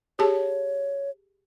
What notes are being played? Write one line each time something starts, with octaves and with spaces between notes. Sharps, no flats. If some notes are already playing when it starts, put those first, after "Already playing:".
G4 G#4 C#5 A5